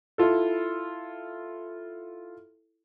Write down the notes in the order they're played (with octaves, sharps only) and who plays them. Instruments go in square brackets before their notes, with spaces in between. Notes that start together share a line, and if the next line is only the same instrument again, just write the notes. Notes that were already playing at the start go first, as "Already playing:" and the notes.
[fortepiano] E4 F4 A4